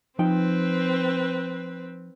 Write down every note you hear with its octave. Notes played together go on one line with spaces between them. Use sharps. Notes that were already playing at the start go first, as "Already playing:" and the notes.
F3 C4 D#4 B4 G5